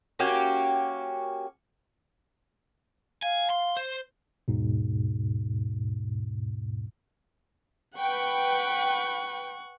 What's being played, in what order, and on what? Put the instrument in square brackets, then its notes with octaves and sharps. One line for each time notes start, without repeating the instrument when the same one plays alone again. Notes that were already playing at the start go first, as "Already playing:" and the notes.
[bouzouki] A#3 C#4 F#4 G4
[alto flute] F5 [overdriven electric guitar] G#5
[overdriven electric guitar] C6
C5
[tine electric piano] D#2 G#2 B2
[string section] B4 G5 [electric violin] F#5 C#6